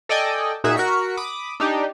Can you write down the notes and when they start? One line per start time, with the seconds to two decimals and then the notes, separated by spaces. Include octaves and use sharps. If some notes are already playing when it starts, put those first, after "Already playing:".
0.09 A4 D5 D#5 G5 G#5
0.64 A#2 D#4 F#4 G#4 E5
0.77 F#4 A#4 B6 C#7
1.17 B5 D6 D#6
1.60 D4 D#4 G4